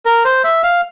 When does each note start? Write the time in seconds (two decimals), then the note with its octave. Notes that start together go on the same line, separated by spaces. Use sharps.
0.05 A#4
0.25 C5
0.44 E5
0.63 F5